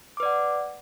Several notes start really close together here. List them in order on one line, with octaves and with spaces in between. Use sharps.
D6 B4 D5 F#5